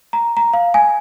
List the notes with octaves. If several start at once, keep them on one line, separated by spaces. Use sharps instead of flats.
A#5
A#5
F5
G#5